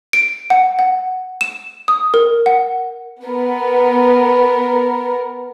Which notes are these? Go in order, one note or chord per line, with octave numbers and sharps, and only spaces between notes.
D7
F#5
F#5
E7
D#6
A#4
F#5
B3 A#4